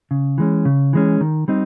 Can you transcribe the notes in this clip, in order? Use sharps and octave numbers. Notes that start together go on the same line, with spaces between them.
C#3
E3 G#3 C#4
C#3
E3 G#3 C#4
D#3
G3 C4 D#4